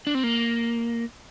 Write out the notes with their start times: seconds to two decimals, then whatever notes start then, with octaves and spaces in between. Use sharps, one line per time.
0.07 D4
0.15 C4
0.24 A#3